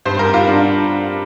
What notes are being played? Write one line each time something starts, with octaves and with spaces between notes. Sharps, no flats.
G2 C5
A#4
G2 F4
D4